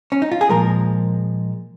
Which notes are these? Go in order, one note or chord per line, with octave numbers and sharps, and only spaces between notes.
C#4
D#4
F4
G#4
A#2 F3 G#3 A#4